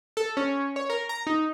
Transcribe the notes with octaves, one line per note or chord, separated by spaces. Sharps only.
A4
C#4
C#5
A#4
A#5
D#4